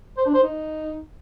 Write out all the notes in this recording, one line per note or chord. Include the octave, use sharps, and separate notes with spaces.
C5
D4
C5
D#4